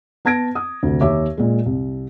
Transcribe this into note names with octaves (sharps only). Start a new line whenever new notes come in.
B3 A5 G#6 A#6 D7
D#6
D2 C3
D#2 C#5 E5 D6
A#2 G#3
C2